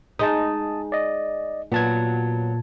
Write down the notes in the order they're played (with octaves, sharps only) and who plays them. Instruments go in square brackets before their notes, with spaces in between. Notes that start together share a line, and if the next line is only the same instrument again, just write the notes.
[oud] G#3 D#4 [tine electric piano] A5 D#6
[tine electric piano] D5 D#5
[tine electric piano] A#2 A5 G#6 [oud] F#3 B3